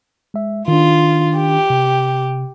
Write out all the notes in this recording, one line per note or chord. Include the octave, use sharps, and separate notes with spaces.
G#3 E5
D#3 D4 F4
G4
C3